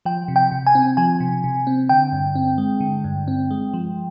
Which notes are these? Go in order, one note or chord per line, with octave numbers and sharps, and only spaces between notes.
F3 G5
C3
G5
C3
G#5
C4
F3 G#5
C3
C3
C4
D3 G5
G2
C4
G#3
D3
G2
C4
G#3
F3